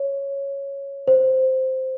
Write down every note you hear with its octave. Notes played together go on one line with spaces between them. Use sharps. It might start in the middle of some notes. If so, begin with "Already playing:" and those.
Already playing: C#5
C5